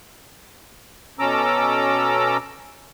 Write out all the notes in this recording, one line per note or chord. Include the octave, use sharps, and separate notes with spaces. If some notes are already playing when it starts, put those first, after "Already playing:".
B2 C#4 A4 A#5 D6 E6